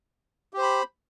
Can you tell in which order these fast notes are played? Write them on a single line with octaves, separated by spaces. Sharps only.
G4 C5 B5